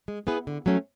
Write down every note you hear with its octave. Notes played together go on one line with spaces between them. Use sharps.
G#3
B3 E4 G#4 B4
D3
F#3 A3 C#4